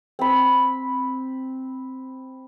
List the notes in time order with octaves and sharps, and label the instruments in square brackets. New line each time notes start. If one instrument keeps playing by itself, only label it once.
[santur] C4 B5